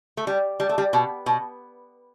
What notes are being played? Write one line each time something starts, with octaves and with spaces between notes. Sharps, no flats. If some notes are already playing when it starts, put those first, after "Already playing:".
A3
G3
G3
A3
G3
B2
B2